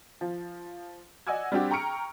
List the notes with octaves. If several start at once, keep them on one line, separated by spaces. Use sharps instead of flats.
F3
D5 D#5 F#5 G#5 E6 G#6
G3 C4 D4 F#4 G4
G5 A#5 C#6 F6 C#7 D7